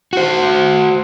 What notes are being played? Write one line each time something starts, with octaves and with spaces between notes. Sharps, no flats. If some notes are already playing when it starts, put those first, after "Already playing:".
F#4 C5